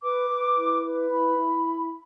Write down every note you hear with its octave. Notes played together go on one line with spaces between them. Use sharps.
B4 D6
B4
E4
B4
E4 B5
E4